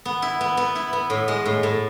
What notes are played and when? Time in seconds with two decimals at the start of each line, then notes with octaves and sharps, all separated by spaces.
0.05 B3
0.22 E4
0.41 B3
0.57 B3
0.75 E4
0.93 B3
1.10 A2
1.28 G#3
1.45 A2
1.63 A2